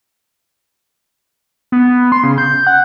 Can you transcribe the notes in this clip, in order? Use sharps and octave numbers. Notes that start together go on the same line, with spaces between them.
B3
C6
C#3
G6
F#5